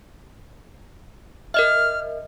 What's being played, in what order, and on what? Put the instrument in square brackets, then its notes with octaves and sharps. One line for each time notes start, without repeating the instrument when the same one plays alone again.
[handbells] A#4 D#5 E5 [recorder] F6